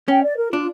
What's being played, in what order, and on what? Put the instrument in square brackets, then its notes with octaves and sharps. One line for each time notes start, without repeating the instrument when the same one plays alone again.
[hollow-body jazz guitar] C#4 [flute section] G5
[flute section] D5
A#4
[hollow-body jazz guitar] D4 [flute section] F4